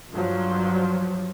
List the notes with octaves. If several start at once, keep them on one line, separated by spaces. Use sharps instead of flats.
G2 F3 F#3